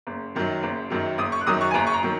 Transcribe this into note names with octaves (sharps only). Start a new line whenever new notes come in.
F#1
F#2 D#3 F#3
F#1
F#2 D#3 F#3
F#1 D#6
C#6
F#6
F#2 D#3 F#3 D#6
C#6
G#5
F#1 A#5
C#6
A#5
D#3 F#3